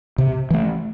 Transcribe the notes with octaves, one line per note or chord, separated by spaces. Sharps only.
C3
E3 A3